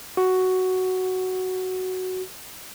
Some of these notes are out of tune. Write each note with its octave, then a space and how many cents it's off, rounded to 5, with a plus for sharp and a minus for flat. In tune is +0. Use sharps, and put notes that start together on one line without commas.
F#4 +5